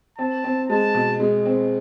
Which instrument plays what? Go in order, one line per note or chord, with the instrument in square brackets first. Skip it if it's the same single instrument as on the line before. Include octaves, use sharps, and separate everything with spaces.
[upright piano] C4 [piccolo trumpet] A5
[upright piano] C4
[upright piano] G#3 [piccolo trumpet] A5
[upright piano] B2
G#3
C4